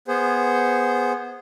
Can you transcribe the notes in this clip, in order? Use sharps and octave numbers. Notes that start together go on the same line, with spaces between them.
B3 G#4 C5